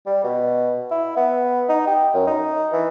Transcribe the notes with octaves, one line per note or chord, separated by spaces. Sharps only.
G3
B2
E4
B3
D#4
G4
F#2
D#4
E3